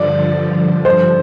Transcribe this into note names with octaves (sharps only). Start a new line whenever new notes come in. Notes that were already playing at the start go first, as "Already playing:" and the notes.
Already playing: G2 D3 F3 D5
C5